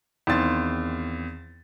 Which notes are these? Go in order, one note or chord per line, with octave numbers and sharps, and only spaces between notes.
E2 D#3 C4 F5 C6 A6